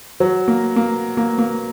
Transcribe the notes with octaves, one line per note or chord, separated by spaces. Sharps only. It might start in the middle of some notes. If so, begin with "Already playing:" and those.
F#3
A#3
A#3
A#3
A#3